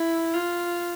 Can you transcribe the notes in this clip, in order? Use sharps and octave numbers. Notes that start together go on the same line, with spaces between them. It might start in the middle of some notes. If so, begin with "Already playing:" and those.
Already playing: E4
F4